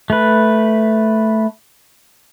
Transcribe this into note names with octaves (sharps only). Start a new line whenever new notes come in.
A3 B4